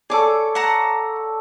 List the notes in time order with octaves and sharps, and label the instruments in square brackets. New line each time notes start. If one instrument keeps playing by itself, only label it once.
[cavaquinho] G#4 D6 [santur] A4 C#5 D5
[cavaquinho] F#5 A5 A#5